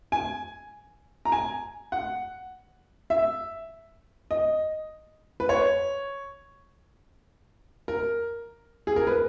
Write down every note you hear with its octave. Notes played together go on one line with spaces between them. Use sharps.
G#5
A#5
G#5
F#5
E5
D#5
B4
C#5
A#4
G#4
A#4
B4